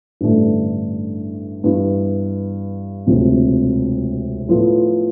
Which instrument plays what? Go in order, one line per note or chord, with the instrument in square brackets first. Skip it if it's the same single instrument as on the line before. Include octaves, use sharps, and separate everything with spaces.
[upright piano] A1 G2 D3 A3 D4
G2 E3 B3
E1 D2 C3 F3
A2 F3 B3 F4